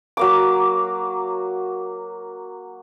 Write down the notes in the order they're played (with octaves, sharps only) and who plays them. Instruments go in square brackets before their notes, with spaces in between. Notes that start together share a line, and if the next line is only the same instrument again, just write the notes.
[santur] F#3 A#3 D6